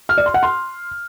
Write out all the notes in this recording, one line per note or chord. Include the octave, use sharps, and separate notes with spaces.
F6
D5
C6
F#5
C6